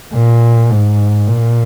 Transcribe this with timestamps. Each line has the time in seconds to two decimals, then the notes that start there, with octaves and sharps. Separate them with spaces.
0.14 A#2
0.70 G#2
1.27 A#2